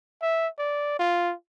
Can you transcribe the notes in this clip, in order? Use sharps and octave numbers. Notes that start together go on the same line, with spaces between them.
E5
D5
F4